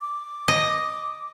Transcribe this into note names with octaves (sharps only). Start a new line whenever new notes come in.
D6
D#5